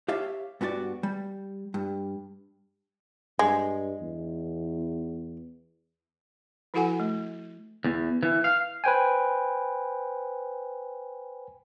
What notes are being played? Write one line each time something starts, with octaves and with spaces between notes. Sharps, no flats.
G4 C#5 E5 F5
G2 B3 F#4 A#4 D5
G3
G2
G2 G#3
E2
F3 E4 F#4 A4 F#5 G#5
A3
E2
E3
F5
B4 C5 G5 G#5